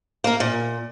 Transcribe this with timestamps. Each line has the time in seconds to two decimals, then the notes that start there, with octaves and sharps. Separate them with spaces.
0.24 A#3 A#4
0.40 A#2